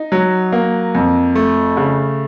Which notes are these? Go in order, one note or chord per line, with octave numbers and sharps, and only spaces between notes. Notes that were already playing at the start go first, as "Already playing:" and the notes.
Already playing: D#4
F#3
A#3
F2
A3
C#3